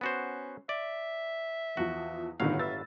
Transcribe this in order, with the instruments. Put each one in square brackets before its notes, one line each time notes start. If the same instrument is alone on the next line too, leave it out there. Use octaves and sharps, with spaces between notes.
[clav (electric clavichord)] B3 F#4 C5 [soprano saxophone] C#4
[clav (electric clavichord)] D5 [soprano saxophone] E5
[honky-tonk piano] E2 F3 [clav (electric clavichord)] F#4
[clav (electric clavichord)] G1 F#3 F5 [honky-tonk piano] A2 D3 D#3 [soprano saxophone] F#5
[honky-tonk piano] B4 E6 A6 [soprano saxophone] E5